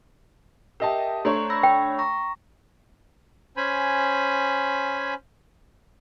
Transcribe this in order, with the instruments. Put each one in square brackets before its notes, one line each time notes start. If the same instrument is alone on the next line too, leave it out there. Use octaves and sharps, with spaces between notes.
[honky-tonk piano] G4 D#5 A5 [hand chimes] A#4 E5 G5
[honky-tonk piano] A3 D4 C#5 [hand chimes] C5 A#5 C6
[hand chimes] B5 E6 A#6
[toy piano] G5
[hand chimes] A#5 C#6 A#6
[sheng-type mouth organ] C#4 C5 G#5 B5